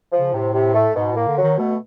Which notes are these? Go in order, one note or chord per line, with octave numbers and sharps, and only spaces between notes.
F3
C#3
A2 C3
C3
A3
G#2 B2
A2 A#3
D3
F#3
D#3
B2 A3